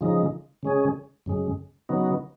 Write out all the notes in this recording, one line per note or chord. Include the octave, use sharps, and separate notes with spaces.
C#3 F3 G#3 D#4
C#3 G#3 C#4 G#4
F#2 C#3 G#3
C#3 F#3 B3 D#4